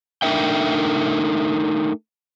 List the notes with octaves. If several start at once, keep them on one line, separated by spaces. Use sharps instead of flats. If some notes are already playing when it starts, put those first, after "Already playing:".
A3 D4 D#4 A#4 E5 G5